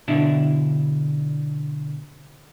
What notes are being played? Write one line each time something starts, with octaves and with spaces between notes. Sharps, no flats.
B2 D3 D4 E4